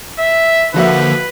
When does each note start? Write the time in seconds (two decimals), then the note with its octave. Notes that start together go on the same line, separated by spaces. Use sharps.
0.19 E5
0.74 D3 F3 A#3 F4 F#4 B4 E5